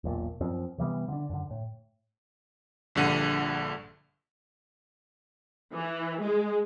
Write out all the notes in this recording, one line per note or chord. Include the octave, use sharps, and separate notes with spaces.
E1 B1 A#2
F#2 F3 C4
C3 E3 G3 B3
D3 D4
F#2 D3
A2
A#1 G2 D3 F#5 D#7
E3
G#3